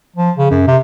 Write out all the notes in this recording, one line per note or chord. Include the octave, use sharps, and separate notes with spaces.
F3
C#3
F#2
C3